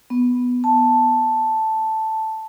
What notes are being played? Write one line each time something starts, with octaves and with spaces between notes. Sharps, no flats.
B3
A5